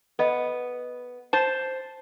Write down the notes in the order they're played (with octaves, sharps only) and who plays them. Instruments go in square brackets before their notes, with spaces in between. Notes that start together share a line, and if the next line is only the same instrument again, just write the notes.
[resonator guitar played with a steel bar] B3 [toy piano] A4 D#5
[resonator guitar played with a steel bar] C5 A5